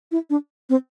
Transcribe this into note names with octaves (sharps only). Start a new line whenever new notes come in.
E4
D4
C4